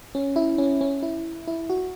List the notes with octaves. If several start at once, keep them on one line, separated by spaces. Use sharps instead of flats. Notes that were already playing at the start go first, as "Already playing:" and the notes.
C#4
E4
C#4
C#4
E4
E4
F#4